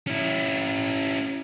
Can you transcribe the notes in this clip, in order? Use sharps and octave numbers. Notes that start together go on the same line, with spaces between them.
C#4 E4